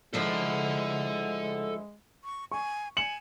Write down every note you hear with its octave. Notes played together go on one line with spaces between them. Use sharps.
D2 F3 G#3 E4 A4 F#5
C#6
G#5 C#6
G#5 C#7 E7 F#7